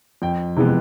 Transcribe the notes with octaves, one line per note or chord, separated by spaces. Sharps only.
F2 G5
C3 E3 G#3 B3